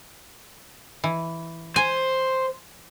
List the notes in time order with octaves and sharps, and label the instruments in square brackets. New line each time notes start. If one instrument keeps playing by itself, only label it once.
[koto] E3
[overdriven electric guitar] C5 [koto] G#5